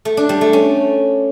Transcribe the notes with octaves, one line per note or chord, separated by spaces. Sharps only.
A3
D4
G3
A3
C#4